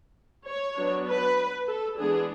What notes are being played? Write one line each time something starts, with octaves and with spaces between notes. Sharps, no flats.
C#5
F#3 B3 D4
B4
A4
E3 G#3 B3 D4 G#4